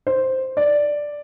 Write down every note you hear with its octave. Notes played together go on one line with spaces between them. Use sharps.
C5
D5